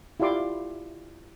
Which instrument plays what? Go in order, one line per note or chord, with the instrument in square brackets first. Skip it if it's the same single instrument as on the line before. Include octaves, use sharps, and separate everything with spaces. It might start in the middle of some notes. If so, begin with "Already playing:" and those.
[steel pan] E4 F4 G4 D5 C6 D6